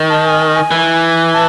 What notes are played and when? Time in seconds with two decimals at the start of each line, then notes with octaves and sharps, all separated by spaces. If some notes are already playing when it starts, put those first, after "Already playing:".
Already playing: D#3
0.10 A5
0.26 G#5
0.55 G#5
0.71 E3
1.33 A5